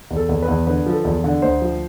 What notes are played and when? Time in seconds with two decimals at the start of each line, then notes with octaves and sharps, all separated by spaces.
0.10 E2
0.16 A4
0.29 E2
0.42 B4
0.48 E2
0.66 D3 B4
0.86 F3
0.92 A4
1.05 E2
1.24 D3
1.42 D2 C5
1.62 F3